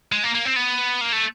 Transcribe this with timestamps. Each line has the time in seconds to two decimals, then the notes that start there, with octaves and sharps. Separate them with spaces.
0.12 G#3
0.24 A#3
0.35 A#3
0.45 C4
0.56 B3
1.01 A#3
1.12 A3